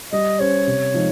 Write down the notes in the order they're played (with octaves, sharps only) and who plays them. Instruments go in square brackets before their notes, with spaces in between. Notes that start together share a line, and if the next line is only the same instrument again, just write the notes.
[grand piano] G3 [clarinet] D#5
[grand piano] C#4 G4 C5 [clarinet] C#5
[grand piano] C3
F3 G#3 D#4